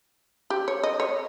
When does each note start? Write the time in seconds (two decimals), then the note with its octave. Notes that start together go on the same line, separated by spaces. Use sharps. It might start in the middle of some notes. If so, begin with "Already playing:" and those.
0.50 G4
0.68 C#5
0.83 D#5
1.00 C#5